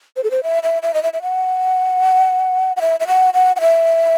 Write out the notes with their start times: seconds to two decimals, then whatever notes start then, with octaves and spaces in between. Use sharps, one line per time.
0.16 C5
0.24 A4
0.31 C5
0.43 E5
0.63 E5
0.83 E5
0.94 D#5
1.03 E5
1.13 E5
1.22 F#5
2.76 F#5
2.81 E5
3.00 E5
3.07 F#5
3.34 F#5
3.56 F#5
3.61 E5